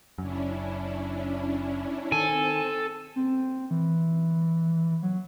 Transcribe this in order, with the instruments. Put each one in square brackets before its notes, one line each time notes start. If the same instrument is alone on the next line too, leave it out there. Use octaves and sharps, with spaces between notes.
[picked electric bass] F#1 F#2 [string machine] C#4 D4 E4
[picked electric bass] D#3 [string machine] C4 [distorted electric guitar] A4 [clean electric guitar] G#5
[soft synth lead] C4
E3
F#3